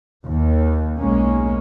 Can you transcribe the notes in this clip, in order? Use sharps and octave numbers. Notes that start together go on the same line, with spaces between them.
D#2
B1 G#3 A#3 C#4